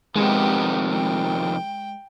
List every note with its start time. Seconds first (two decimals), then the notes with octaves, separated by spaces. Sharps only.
0.16 F2 C3 D#3 G#3 B3 G4
0.93 G5